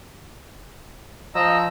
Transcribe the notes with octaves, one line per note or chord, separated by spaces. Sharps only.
F3 D#5 A#5 E6